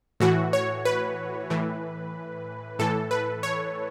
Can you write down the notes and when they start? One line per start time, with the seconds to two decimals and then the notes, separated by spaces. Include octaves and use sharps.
0.20 A2 E3 F#4
0.53 C#5
0.85 B4
1.50 A2 E3
2.79 A2 E3 A4
3.11 B4
3.43 C#5